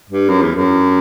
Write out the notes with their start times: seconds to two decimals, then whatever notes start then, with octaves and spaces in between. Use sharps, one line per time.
0.10 G2
0.29 F#2
0.42 E2
0.55 F#2